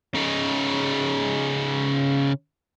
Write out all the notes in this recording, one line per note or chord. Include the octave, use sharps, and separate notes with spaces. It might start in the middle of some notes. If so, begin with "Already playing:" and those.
C#3 D#4